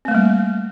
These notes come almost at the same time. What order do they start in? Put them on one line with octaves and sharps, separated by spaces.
C4 A3 A#3 G3